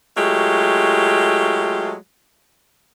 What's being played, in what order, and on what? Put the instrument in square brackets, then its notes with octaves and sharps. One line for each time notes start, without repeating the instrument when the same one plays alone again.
[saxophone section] F#3 G#3 A3 F4 G4